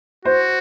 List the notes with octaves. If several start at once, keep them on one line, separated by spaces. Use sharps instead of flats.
F#4 C5